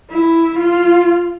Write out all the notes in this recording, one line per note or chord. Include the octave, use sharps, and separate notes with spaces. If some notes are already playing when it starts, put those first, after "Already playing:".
E4
F4